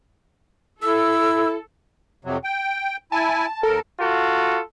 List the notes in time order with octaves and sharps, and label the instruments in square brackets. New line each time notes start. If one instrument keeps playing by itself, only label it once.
[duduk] E4 [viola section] A4 [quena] E6
[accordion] F2 C3 F#3
G5
[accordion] E4 G#5 [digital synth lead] A5
[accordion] D#2 A#4 [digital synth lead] A4
[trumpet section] F4 F#4 A4